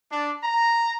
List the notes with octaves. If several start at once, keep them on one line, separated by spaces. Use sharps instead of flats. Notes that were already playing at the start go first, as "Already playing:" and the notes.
D4
A#5